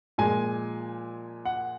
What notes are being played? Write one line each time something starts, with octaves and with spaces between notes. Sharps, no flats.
A#2 F3 G#3 G#5
F#5